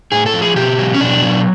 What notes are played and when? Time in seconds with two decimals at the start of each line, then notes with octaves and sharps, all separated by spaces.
0.12 A2 G#4
0.26 A4
0.33 F3
0.42 G#4
0.56 B2 G4
0.79 F#3
0.94 C#4
1.00 B2 D4
1.22 F#3